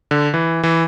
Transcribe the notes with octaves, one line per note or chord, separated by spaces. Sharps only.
D3
E3
E3